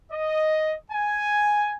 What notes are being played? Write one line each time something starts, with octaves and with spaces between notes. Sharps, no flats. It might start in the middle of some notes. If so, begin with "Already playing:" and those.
D#5
G#5